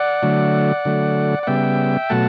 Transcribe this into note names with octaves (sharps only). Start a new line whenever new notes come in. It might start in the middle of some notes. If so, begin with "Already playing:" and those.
Already playing: D5 F#5
D3 F#3 A3
D3 F#3 A3
F#5
C#3 G3 B3 E5 G5
B2 F#3 A3 F#5 A5